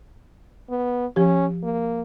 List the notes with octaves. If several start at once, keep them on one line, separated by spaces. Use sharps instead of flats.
B3
F3 C#4 G4
A#3